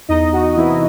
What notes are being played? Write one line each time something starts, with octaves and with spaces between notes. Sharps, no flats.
E2 D#4 D#5
F#4
C3 E3 E4